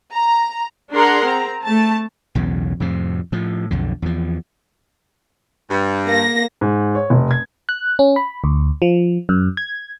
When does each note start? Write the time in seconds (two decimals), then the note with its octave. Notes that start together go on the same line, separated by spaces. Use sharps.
0.11 A#5
0.92 D4 G#4 A#4 F#5 A#5 C6
1.25 C4 A#5
1.64 A3 A5
2.35 B1 E2 C#3
2.80 F2 A2 C3
3.32 A2 F3
3.71 B1 F2 D3
4.02 E2 F3
5.70 G2
6.07 A#3 A#6
6.61 G#2
6.95 C#5
7.10 F1
7.31 G#6
7.69 F#6
7.99 C#4
8.16 B5
8.44 D2
8.82 F3
9.29 F#2
9.57 G#6